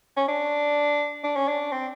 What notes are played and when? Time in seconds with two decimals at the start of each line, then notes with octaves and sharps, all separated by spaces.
0.17 C#4
0.28 D4
1.24 D4
1.36 C#4
1.48 D4
1.72 C4